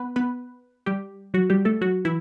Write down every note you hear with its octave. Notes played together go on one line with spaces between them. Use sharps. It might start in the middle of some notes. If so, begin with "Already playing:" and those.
Already playing: B3 B4
B3 B4
G3 G4
F#3 F#4
G3 G4
A3 A4
F#3 F#4
E3 E4